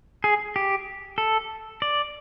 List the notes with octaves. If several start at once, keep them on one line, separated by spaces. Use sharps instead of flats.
G#4
G4
A4
D5